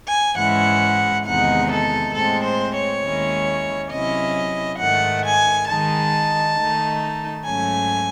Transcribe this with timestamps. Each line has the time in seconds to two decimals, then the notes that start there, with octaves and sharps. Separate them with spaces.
0.08 G#5
0.37 G#2 E3 G#3 C#4 E4 F#5
1.25 E2 C3 D#3 G#3 D#4 F#5
1.71 A4
2.14 A2 G#3 C4 A4
2.44 C5
2.74 C#5
3.03 D#2 D#3 G#3 C#4 E4
3.91 C3 F#3 C#4 E4 D#5
4.80 G#2 D#3 A3 F#5
5.25 G#5
5.68 D#3 G#3 D#4 A5
6.57 D#3 A3 D#4
7.46 G#2 F#3 A3 C#4 G#5